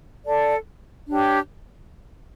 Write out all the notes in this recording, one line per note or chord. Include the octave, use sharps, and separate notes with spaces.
A4 D5 A5
D4 G4 C#5 G5